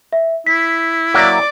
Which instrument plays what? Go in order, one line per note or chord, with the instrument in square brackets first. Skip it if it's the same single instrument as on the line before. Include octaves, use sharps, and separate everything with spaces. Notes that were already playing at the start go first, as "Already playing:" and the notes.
[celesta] E5
[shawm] E4 [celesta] B6
[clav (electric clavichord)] F#3 A#3 E5 [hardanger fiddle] D5 D6